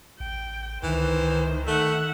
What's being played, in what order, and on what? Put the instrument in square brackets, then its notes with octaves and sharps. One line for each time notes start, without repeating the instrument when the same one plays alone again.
[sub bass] A1 [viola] G5
[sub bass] C#2 [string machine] D#3 [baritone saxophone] E3 [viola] C5
[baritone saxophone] A3 [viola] E5 F#5